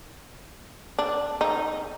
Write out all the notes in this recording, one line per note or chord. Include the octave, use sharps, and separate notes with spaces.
D4
D#4